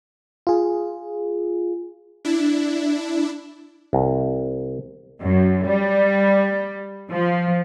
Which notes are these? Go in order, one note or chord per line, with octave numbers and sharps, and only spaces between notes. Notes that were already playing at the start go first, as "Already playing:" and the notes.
F4 G#4
D4 E4
C2
F#2
G3
F3